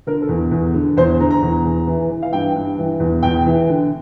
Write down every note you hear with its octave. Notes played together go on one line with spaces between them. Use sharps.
D3 A#4
A4
E2
E2
D3
E2 C5
D3 A#5
A#5
E2
E2
E3
E3
F5
G2 G5
G2
E3
E2
E2 G5
E3
D3